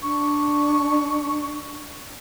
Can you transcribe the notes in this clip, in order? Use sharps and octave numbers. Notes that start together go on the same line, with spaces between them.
D4 C#6